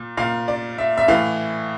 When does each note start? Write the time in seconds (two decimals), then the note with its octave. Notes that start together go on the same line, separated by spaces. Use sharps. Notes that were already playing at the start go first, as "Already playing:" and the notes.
Already playing: A#2
0.17 A#2 F5
0.48 D5
0.78 E5
0.98 E5
1.08 A2 E3 F5